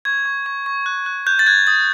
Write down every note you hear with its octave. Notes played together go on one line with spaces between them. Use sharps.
C#6 G#6
C#6
C#6
C#6
F#6
F#6
F#6 G6
A6
F#6 G#6
D#6 A6